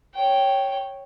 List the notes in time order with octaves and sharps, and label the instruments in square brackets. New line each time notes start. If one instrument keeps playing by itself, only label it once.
[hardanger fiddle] C#5 G5